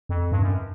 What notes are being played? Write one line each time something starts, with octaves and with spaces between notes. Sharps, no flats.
F2
G2
F#2